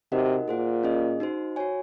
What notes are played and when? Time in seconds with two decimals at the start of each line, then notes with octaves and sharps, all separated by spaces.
0.12 C3 D#4 F#4 A#4 D#5 F#5
0.48 A#2 G#4 C5 F#5
0.83 C#4 G#4 D#5
1.20 D#4 F#4 C5
1.56 F#4 C#5 G#5